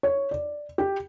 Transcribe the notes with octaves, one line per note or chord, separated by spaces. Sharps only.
C#5
D5
G4